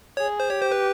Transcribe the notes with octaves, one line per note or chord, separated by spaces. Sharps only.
G#4 C#5
C5
G4 C#5
C5
B4